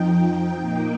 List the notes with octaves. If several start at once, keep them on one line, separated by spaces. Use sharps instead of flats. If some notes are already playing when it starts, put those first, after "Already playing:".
Already playing: F2 F3 D#4 G5
A#2 A#3 D#4